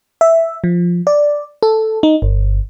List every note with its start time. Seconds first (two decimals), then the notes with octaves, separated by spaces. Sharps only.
0.21 E5
0.64 F3
1.07 D5
1.63 A4
2.03 D#4
2.22 G1